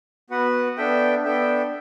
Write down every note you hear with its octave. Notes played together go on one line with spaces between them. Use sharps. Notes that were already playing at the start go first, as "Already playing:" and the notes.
B3 F#4 B4 F#5
B3 D4 A4 E5 G5
B3 D4 A4 E5 G5